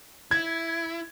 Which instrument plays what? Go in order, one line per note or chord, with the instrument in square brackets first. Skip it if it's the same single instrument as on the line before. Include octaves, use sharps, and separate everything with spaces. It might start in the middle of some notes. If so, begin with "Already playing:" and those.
[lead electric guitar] E4 [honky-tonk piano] G#6